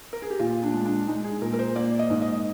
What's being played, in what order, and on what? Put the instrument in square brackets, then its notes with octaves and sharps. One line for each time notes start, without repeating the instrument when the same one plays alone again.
[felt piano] A#4
G#4
G4
A#2 F4
D4
G#3
D4
G#3 D#4
G#4
A#2 A#4
A#4
C5
A#3 D5
D#5
G#2
D#5